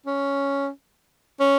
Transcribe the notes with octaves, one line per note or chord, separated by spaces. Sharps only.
C#4
C#4